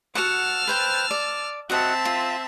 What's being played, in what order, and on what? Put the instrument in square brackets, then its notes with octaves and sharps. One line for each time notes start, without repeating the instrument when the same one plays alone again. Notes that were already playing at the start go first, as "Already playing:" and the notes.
[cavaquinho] F#4 F#5 [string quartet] A5 E6 F6
[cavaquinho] B4 C5 G5
D5
[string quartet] C4 E5 A5 [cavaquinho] F#4 D#5 F#5
[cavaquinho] F4